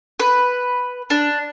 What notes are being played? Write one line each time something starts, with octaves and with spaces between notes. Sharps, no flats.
B4
D4